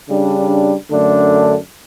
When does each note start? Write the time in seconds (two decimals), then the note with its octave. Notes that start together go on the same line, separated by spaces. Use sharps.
0.08 C#3 G3 D4
0.90 F#2 D3 A3 D4